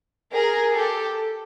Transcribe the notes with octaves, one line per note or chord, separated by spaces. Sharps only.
G#4 A#4
G4 A4